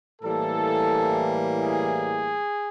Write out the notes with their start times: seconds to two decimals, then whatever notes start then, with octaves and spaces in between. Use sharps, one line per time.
0.22 A2 E3 G3 A#3 A4
1.61 G#4